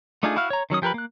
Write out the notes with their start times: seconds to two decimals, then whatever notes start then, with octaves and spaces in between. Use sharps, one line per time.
0.23 A3 D4 D#4 F4 G#4
0.36 E4 F#4 F5 F6
0.50 C#5 A#5
0.70 D#3 F#3 C#4 D#6
0.82 F3 G4 A#4 B4 B5
0.94 A#3 F#6